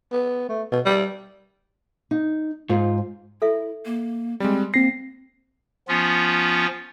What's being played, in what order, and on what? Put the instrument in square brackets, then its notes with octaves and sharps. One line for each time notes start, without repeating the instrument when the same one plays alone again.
[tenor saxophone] B3
A3
B2
G3
[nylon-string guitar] D#4
[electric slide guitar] G#2 [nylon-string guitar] F4 C5
[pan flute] E4 [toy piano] A4 E5
[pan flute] A#3
[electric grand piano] G3 G#3 [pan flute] C4
[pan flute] A#3 [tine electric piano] C4 C7 [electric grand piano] A#6
[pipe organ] F3 B3 C#4 F4